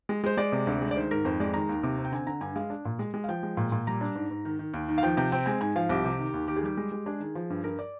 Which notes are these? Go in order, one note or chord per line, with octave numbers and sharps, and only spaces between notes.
G#3
G#3 C5
G#3 D5
C3
D2
G#3
D5
D#3 C5
G#2 A#4
F2 C5
G#3 D5
D#3 A#5
D#2
C3
C4
G5
D3 G#5
D3 A#5
G2 G#5
G#3 F5
D4
A#2
G#3
G#3
F5
F3 G5
G#3
A#2
A#2
G3 A#5
D4
G#2
G#2
D#3
D#3
D#2
D#3
F5
F3 G5
C3 G5
C4 G5
G#3 G#5
G#2 G#5
F3 F5
C2 G4
C3
D#3
D#2
D#3 G4
G#4
G3 G4
G#3
G#3
D4 G#4
D#3
F3
G2
G2 A#4
D5